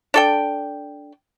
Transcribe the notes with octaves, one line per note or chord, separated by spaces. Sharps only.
D4 A4 G5